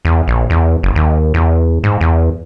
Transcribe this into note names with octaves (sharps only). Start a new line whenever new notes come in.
E2
A#1
E2
F#1
D#2
E2
G#2
E2